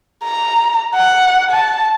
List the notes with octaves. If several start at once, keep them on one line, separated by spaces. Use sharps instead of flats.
A#5
F#5
A5